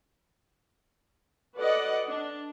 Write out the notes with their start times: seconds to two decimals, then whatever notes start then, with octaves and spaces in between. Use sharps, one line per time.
1.57 F#4 A4 B4 D5 D#5 F#5
2.03 D4